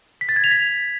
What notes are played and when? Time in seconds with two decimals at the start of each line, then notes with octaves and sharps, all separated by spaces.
0.21 B6
0.29 A6
0.36 G#6
0.44 F7
0.51 B6